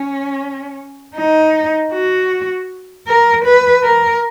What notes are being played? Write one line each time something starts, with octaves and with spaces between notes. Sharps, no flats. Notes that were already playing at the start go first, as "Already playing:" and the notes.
Already playing: C#4
D#4
F#4
A#4
B4
A#4